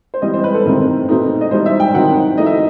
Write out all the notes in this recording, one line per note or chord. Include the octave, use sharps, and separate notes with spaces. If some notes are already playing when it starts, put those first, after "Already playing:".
C5
E3 G3 C4 D#5
C5
B4
A4
C3 D#3 A3 C4 D#4
B2 A3 C4 D#4
D#5
E3 G3 D#4 C5
E5
G5
D#3 F#3 C4 D#4 F#5
E3 A3 D#4 D#5
E5